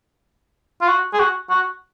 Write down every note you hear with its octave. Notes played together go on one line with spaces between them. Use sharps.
F4
F#4
G#4
F#4
F#4